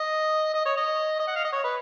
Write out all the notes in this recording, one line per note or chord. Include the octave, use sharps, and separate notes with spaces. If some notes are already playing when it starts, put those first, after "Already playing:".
Already playing: D#5
D#5
C#5
D#5
D#5
F#5
F5
D#5
C#5
B4